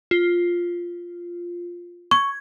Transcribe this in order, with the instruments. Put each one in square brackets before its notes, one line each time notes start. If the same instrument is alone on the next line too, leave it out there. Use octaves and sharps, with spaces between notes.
[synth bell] F4
[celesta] C#6 [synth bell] G#6